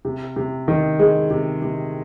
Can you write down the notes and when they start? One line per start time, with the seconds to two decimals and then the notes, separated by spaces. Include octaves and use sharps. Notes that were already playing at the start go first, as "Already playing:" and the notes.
0.05 C3
0.36 C3
0.68 D#3
0.99 G#3
1.30 C3
1.62 C3